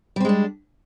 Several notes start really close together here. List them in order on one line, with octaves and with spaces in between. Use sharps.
G3 C4 G#3 D4